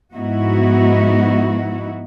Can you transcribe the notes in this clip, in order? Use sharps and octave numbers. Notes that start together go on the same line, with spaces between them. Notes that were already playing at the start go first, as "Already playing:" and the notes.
G#2 F3 B3 D#4 E4 F#4